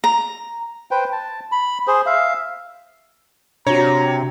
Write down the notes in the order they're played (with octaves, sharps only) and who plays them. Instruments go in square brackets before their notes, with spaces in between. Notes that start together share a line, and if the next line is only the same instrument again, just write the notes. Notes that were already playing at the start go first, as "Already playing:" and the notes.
[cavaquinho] A#5
[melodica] B4 C5 G5
A5
B5
G#4 C5
E5 F5
[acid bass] C3 [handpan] D4 F#4 [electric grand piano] C#5 [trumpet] A#5